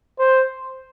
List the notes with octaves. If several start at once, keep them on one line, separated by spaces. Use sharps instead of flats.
C5